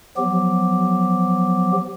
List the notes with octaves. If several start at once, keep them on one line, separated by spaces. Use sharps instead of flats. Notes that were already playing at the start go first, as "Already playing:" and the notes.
F3 F#3 B3 G4